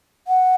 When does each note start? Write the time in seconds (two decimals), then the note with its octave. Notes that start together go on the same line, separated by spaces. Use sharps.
0.28 F#5